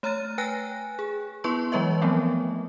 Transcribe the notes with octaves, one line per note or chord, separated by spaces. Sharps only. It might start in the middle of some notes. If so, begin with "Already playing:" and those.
A3 C#5 A#5 F6 A6 D#7
B4 G5 G#5 F#6 A#6
G#4
B3 E4 B4 C6 C#6
E3 F#3 G#3 B4 D#5 E5
F3 F#3 A3 B3 C4